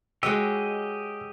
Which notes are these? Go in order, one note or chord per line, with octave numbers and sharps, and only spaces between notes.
G#3 F#4 G4 C#5 D#5 E6